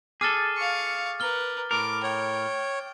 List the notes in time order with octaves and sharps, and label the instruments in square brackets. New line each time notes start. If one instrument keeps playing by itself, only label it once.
[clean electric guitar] G#4 A4 [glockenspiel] D6 F6 A6
[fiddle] F5 C#6
[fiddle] A#4 B4 [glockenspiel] F6 G7
[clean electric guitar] A2 A#4 [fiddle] D6
[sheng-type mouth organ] C#5 [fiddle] G5